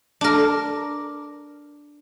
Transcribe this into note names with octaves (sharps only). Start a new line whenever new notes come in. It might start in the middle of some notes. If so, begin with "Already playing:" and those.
D4 A#4